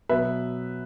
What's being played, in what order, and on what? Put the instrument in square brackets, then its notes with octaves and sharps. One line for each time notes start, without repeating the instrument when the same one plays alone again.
[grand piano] B2 F#3 B3 B4 E5